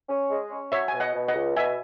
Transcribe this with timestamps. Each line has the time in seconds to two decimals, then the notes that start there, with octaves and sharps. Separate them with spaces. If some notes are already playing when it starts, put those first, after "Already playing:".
0.09 C#4
0.29 G#3
0.51 C#4
0.71 F#3 C#5 E5
0.88 B2 G#5
1.00 D#5 F#5
1.14 B2
1.28 D#5 F#5
1.35 C#2
1.56 B2 E5 G#5